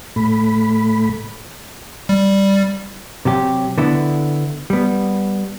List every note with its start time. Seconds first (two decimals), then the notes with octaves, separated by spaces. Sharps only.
0.16 A2 A3 B5
2.09 G3
3.25 C3 F#3 G4
3.78 D3 B3 E4
4.70 G3 B3